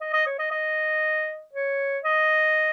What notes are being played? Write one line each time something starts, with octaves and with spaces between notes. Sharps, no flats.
D#5
D#5
C#5
D#5
D#5
C#5
D#5